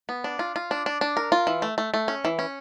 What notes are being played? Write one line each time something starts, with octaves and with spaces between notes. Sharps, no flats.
B3
D4
F4
F4
D4
D4
D4
A#4
F4
E3
A3
A3
A3
C#4
E3
C#4